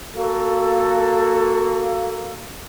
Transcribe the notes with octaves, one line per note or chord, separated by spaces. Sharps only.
A#3 F#4 A4